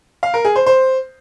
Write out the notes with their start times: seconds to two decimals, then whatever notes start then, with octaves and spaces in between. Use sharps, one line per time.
0.23 F5
0.34 A#4
0.45 G#4
0.56 C5
0.66 C5